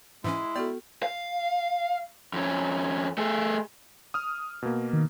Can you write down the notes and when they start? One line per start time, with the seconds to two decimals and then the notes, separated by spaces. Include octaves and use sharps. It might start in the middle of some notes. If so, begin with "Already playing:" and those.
0.24 G#2 E3 G#3 C#4 E4
0.56 B3 F#4 A4 D5
1.03 F5
2.33 F2 C#4
3.18 A3 G#4
4.14 D#6 F6
4.62 B2 A#3
4.93 D#3